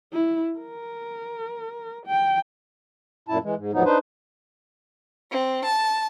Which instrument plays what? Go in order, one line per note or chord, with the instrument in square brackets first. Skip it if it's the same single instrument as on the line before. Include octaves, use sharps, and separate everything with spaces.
[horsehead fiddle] E4
A#4
G5
[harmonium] F#2 A#2 E4 A5
E3 G#3
G#2
E2 A2 F3 F#3 B3 D#4
D4 D#4 B4 C5
[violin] C4
A5